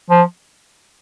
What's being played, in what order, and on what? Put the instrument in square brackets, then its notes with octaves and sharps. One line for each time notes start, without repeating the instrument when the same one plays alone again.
[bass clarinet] F3